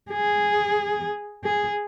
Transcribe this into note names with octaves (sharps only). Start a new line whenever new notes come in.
G#4
G#4